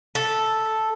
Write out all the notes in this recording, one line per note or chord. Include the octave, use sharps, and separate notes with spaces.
A4